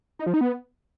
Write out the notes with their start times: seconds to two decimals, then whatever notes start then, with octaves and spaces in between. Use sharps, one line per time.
0.19 D#4
0.27 F3
0.34 D#4
0.41 B3